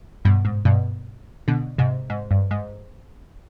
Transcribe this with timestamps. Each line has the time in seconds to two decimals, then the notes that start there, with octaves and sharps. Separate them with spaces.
0.25 G2 B2
0.45 G#2
0.65 G2 B2
1.48 B2 D3
1.78 G#2 C3
2.10 G#2
2.31 G2
2.51 G#2